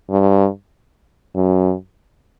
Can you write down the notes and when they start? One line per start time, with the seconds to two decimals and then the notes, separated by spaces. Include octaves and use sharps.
0.10 G2
1.35 F#2